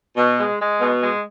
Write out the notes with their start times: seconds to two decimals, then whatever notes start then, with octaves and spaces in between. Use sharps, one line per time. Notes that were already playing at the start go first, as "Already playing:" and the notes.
0.17 B2
0.38 G#3
0.60 G#3
0.81 B2
1.03 G#3